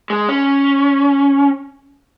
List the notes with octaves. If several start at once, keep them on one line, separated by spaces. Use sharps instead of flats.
G#3
C#4